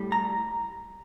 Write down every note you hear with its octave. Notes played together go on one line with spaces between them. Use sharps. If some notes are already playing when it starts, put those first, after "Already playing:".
Already playing: A2 G3
A#5